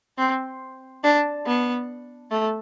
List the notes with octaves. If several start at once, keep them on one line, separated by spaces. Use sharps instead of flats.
C4
D4
B3
A3